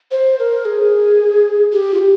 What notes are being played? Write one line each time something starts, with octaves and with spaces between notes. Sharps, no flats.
C5
A#4
G#4
G4
F4
G4